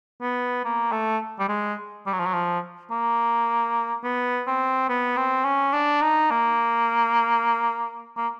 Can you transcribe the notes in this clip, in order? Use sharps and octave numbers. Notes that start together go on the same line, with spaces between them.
B3
A#3
A3
G3
G#3
G3
F#3
F3
F#3
F3
A#3
B3
C4
B3
C4
C#4
D4
D#4
A#3
A#3